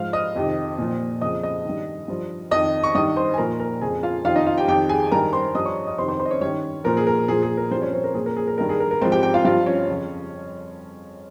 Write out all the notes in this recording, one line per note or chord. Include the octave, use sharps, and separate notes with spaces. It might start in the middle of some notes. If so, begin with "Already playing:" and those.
Already playing: G#2 F3 F5 F6
D#5 D#6
F2 C3 D#3
A#2 F3
F2 C#3 F3 D#5 D#6
D#5 D#6
G2 D#3
G2 F3
F2 D#3 D#5 D#6
C#6
G2 D#3 D#5 D#6
C5 C6
G#5
A#2 F3 A#4 A#5
A#4 A#5
F2 C#3 F3 G#4 G#5
F4 F5
F2 C3 D#3 F4 F5
D#4 D#5
F4 F5
G4 G5
F2 D#3 G4 G5
G#4 G#5
G2 D#3 A#4 A#5
C5 C6
G2 F3 D#5 D#6
C#5 C#6
D#5 D#6
F2 C3 D#3 C5 C6
C5 C6
C5 C6
D#5
C#4 C#5
G2 D#3 C#4 C#5
A#2 F3 A#4
G#4
A#4
A#2 F3 G#4
G#4
A#4
G2 F3 C4 C5
C#4 C#5
C4 C5
A#4
A#2 F3 G#4
A#4
G#4
A#4
G2 D#3 A#4
G#4
A#4
A#4
G#2 F3 C4 C5
G4 G5
G4 G5
F4 F5
G2 F3 F4 F5
C#4 C#5
F2 C#3 F3